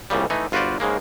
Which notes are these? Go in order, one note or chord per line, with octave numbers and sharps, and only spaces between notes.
C2 A#2 C#3 G3
E3 A3 D#4
G1 F4 F#4 B4 C5 D5
G#2 C#3 G#3 A#3